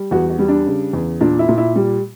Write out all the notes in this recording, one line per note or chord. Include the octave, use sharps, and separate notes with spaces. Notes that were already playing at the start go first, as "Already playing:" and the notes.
Already playing: G3
E2 F#4
F#4
G3
D4
C#3
E2
A#2 D4
E4
A#2
E4
G3